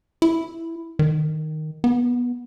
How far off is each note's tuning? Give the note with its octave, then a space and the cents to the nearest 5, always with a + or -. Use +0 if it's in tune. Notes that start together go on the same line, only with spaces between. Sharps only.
E4 +5
D#3 -5
B3 -15